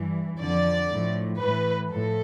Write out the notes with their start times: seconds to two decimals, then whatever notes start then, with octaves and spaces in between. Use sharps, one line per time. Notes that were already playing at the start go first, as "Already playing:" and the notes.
Already playing: G2 E3
0.40 F2 D3 F3 D5
0.90 A2 F3
1.40 A2 E3 B4
1.90 A2 F3 A4